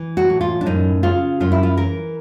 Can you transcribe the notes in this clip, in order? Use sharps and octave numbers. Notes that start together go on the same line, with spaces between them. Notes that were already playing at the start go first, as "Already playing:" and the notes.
Already playing: E3
F#4
A2
F4
D4
F#2 D#4
C#3 F4
F#2 F4
E4
F4
E3 A#4